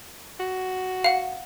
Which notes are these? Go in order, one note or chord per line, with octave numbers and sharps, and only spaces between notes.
F#4
F5 F#5